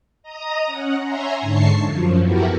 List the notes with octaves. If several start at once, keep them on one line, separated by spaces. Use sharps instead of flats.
D#5 A#5 D#6
C#4 F#5
C#5 E5 G#5 A#5 C6
G#2 D3 A5 C#6 C7
F#2 F3
B3 E4 F#4 G4 A4 A#4